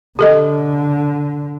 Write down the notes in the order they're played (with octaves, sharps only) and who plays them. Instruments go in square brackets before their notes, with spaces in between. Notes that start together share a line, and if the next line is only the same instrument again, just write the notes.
[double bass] D3 [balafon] G4 A4 D#5